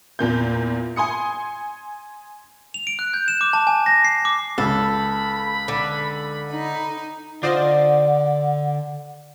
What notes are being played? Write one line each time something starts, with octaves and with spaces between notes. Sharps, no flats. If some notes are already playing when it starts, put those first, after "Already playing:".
E2 A#2 G6
G#5 C6 D#6 C#7
F7
D7
F#6
G6
E7
D6
A5
G#5
A#6
C7
D6
C#2 A4 B5
D3
D#4
D3 F4 C5 D5 D#5 F#5